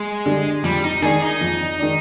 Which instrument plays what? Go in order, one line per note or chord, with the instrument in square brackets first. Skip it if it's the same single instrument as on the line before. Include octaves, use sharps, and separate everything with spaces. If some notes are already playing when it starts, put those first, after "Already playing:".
Already playing: [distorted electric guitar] G#3
[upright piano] D3 G3
[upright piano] F2 [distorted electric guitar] G3
[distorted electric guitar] D#4
[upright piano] D#3 G#3 D4 [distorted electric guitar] G#4
[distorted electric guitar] D#4
[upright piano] F2
D#3 G#3 D4